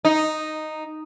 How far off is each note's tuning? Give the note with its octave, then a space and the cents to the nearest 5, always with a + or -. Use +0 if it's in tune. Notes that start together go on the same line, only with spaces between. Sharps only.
D#4 -5